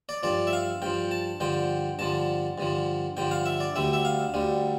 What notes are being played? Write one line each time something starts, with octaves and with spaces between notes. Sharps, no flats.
D5
G2 F3 D5
E5
F5
G2 F3 G5
A5
G2 D3 F3 G5
G2 D3 F3 A5
G2 D3 F3
G2 D3 F3 G5
F5
E5
D5
D2 D3 G3 E5
E5
F5
D2 D3 G3